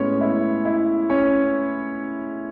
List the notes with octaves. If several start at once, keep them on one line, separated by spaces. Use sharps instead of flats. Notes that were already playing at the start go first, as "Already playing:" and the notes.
Already playing: A2 G#3 B3 C#4 C#5
E4
E4
C#4 C#5